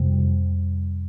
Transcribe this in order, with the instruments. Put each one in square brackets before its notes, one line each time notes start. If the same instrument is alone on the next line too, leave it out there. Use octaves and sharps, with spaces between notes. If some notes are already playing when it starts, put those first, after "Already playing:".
Already playing: [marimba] F2 C3 G3